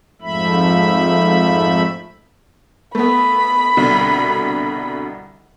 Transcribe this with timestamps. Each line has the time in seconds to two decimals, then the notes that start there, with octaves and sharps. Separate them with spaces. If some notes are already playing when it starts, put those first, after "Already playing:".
0.22 F2 G#2 F3 A3 E5 B5
2.95 A3 B3 B5
3.77 C2 B2 D3